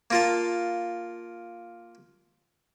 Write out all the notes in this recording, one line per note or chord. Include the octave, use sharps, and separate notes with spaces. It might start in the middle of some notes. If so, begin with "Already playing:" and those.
A#3 F4 A5